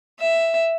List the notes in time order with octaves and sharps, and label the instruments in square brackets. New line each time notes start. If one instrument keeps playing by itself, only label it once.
[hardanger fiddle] E5